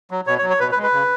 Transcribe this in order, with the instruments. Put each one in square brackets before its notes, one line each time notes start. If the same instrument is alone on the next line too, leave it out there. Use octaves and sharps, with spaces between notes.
[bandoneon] F#3
B2 C#5
C#5
F#3
C#5
B2 B4
B4
G#3
B4
C#3